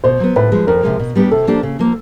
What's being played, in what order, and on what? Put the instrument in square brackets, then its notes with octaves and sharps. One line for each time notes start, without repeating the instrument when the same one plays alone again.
[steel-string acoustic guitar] B2 [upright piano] C5
[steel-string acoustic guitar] F#3 B3
[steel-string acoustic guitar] A2 [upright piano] B4
[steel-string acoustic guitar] F3 G#3
[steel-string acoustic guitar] F2 [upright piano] A#4
[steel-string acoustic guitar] C3 F3 G#3
B2
G3 B3 D4 G4
[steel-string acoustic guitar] C3 [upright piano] A4
[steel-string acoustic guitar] F3 A#3 D4 G4
C#3
F3 A#3